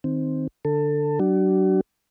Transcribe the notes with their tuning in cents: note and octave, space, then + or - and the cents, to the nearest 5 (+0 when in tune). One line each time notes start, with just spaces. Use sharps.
D#3 +0 C4 +0
D3 +0 A4 +20
F#3 +35 D4 +0 F#4 +35